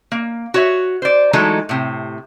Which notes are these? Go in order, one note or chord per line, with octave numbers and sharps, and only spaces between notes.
A#3
F#4 C#5 E5
C5 D5
E3 F#3 G#3 A3 D#4 A4
A2 C3